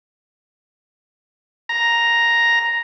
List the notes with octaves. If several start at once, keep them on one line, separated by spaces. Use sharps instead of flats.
A#5